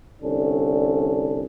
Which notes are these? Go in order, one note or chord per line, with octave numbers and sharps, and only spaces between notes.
C2 D3 C#4 D4 A4